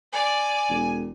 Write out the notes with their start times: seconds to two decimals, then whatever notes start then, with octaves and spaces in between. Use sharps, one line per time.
0.13 D5 G#5
0.70 E1